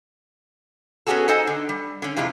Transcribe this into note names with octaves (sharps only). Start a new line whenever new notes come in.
B3 C#4 D#4 F#4 G#4 A4
D#4 A4 C5 D#5 G#5
D3
G3
D3 C#4
F2 C3 G#3 E4 F4